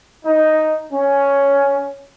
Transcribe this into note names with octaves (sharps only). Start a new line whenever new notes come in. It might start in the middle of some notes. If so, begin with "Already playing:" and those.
D#4
C#4